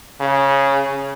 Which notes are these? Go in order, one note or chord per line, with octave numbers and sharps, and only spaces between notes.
C#3